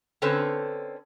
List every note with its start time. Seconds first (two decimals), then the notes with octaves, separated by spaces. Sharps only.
0.22 D3 C4 C#4 A4 B4 C5